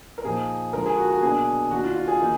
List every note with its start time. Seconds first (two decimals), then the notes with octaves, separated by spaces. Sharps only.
0.18 A#4
0.24 A#2 F3 A#3 D#4 G#4
0.73 D3 F3 G#3 A#4
0.86 G#4
0.97 F#4
1.10 F#4
1.22 B2 F#3 A#3 D4 G#4
1.71 D#3 A#3 D4 F#4
1.84 F4
1.96 F4
2.08 G#4
2.20 D#3 A#3 D#4